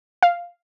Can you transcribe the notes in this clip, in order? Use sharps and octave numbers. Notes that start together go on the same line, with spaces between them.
F5